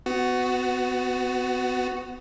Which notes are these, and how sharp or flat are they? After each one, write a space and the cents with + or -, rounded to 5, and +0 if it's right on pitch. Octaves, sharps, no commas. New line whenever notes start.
B3 +30 F#4 +0